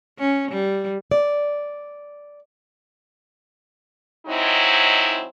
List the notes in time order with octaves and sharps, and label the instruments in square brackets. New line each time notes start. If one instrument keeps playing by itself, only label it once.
[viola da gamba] C#4
G3
[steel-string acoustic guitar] D5
[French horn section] F#3 G#3 C4 D#4 E4